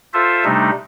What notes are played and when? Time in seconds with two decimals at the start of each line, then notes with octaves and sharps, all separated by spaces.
0.13 F4 A4 C5 E5
0.45 C3 G3 A3 D4 D#4